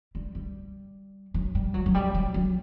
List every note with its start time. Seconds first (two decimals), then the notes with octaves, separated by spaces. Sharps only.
0.15 G3
0.35 G3
1.34 F#3
1.55 G3
1.74 F#3
1.86 F#3
1.94 G3
2.14 F#3
2.34 F#3